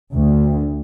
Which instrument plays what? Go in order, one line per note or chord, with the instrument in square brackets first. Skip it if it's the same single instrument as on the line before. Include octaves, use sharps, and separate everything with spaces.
[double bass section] D2